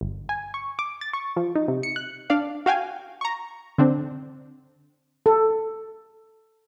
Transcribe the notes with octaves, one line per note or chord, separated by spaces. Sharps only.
G1
G#5
C#6
D6
A6
C#6
F3
D#4
C3
C#7
F#6
D4 D5 F5
F#4 F5 G5 G#5
A#5 C#6
D3 C4 D4
A4